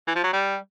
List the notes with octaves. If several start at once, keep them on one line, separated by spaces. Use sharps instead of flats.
E3
F3
F#3
G3